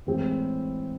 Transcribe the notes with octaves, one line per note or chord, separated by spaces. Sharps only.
A2 E3 G#3 C4 E4